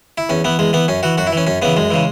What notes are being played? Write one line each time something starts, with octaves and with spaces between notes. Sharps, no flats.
E4
E2 C#4
E3 B3
E2 G#3
E3 B3
F#2 C#4
E3 F#4
F#2 F#4
E4
E3 C#4
F#2 C#4
C#3 E3 B3
F#2 G#3
C#3 E3